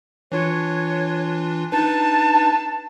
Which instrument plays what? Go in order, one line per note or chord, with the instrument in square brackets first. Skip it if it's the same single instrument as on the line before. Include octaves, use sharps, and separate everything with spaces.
[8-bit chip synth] E3 D4 F4 [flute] C#5
[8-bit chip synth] D4 D#4 B4 [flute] A5